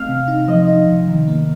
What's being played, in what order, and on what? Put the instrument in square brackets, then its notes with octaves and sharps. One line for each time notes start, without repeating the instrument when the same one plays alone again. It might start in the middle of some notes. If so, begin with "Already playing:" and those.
Already playing: [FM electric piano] A3 C4 [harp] F5
[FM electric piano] C3
D#4
[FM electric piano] F3 [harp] D#5
[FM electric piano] D#4
C3
D#3
A#3